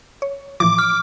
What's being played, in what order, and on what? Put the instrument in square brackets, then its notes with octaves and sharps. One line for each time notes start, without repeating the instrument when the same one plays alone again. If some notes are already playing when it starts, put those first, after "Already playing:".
[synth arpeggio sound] C#5
[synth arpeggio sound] A2 E3 F3 [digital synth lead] D6
[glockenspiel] F6